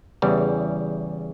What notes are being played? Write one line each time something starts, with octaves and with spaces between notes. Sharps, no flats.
E2 C#3 E3 G3